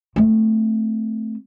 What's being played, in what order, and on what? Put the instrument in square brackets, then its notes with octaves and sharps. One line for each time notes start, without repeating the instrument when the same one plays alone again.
[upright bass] A3 C4